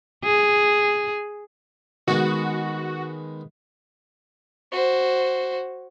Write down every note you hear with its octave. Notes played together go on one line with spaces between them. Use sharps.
G#4
D#3 G#3 B3 F#4
F#4 C5